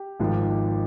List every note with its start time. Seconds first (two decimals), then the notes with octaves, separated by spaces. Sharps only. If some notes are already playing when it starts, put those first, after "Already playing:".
Already playing: G4
0.20 G#1 G#2 F3